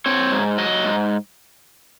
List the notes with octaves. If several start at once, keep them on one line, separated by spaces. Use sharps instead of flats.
C4 C#5
G#2
F#3 D#5
G#2